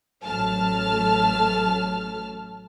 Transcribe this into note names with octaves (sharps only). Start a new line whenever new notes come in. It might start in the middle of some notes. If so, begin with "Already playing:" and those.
A1 F#3 A3 A5 F6